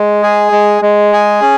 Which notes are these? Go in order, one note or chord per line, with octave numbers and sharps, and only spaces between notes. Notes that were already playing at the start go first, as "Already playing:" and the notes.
Already playing: G#3
G#4
G#3
G#3
G#4
C#4